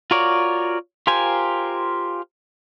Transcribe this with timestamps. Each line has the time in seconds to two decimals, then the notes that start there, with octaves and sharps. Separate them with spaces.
0.11 F4 F#4 A#4 C#5 D5
1.07 F4 G4 A#4 C5 G#5